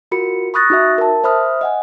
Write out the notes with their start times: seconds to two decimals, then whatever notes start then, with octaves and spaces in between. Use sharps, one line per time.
0.11 F4 F#4 A#4 B5 C#7
0.54 B5 C#6 D#6 F#6 A6 A#6
0.70 D#4 F#4 E5
0.98 A#4 A5
1.24 C5 E5 B5 D#6 F6
1.61 D#5 F#5 G#5